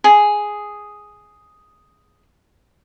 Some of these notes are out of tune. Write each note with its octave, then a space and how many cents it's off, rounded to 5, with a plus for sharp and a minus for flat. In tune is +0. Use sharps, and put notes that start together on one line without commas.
G#4 +0 G#5 +5